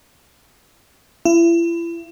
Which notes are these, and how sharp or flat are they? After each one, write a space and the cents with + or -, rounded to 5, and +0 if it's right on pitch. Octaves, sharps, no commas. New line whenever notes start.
E4 +35